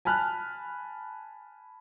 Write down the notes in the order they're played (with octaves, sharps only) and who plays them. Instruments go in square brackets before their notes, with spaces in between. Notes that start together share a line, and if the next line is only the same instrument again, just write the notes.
[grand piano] G#5 A5 B5 F6 F#6